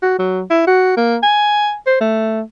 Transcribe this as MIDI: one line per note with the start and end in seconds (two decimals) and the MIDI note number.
0.02 0.19 66
0.19 0.42 54
0.51 0.64 64
0.67 0.93 66
0.97 1.18 58
1.23 1.75 80
1.87 2.00 72
2.01 2.42 57